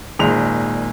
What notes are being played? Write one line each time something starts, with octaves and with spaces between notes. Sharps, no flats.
G#1 A#2 G#3 F7